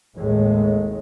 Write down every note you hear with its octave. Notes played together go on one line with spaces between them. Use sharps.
G#1 D#2 A2 G#3